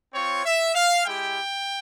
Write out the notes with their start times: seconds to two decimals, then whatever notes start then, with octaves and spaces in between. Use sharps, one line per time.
0.14 C4 F4 C#5
0.46 E5
0.75 F5
1.06 G#3 E4 G4 G5